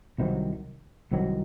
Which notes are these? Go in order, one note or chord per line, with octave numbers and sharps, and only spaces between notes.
C2 C3 D#3 F#3
C2 C3 D#3 F#3